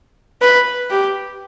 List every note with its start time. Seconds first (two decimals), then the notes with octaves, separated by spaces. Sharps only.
0.42 B4
0.91 G4